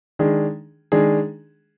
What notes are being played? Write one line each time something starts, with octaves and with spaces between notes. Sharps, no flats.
D#3 G#3 D4 G#4
D#3 G#3 D4 G#4